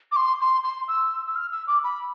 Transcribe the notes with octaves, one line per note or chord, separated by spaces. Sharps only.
D6
C6
C6
C6
E6
E6
F6
E6
D6
B5